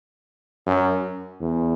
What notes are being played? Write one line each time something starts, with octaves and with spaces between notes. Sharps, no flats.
F#2
E2